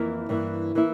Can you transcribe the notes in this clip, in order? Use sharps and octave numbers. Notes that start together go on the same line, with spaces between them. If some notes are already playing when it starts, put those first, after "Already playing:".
Already playing: F2 E3 A#3 E4 A#4
G2 E3 A#3 E4
E3 A#3 E4